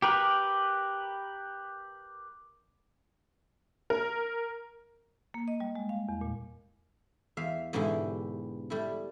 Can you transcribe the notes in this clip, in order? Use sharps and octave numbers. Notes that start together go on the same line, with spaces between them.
G4 A#4 B4
A#4
A#3
D#5
G3
G#3
F5
E2
A#2
E2 E5 F5
G#2 B2 D3 E3 E4 G4
G3 A3 E4